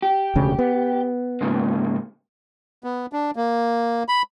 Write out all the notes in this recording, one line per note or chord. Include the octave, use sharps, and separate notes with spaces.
G4
E1 D2 C#3
B3
G#2 C#3 A#3
B3
D4
A#3
B5